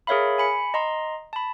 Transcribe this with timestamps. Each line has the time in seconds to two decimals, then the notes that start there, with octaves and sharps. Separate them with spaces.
0.07 G#4 A#4 C#5 E5 F5 B5
0.38 G#5 B5 C#7
0.74 D#5 A#5 C6
1.33 A5 B5